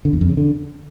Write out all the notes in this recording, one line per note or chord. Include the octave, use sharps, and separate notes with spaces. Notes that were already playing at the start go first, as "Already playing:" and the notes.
D3
E2
F2
C#3
D3